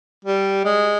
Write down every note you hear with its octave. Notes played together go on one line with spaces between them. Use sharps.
G3
G#3